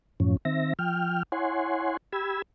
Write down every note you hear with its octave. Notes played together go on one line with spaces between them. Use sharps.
F#2 A2 F3 C#4
D#3 C4 E5 A#6
F3 G5 F6
E4 C#5 F#5 G#5 C6
G4 B5 E6 G#6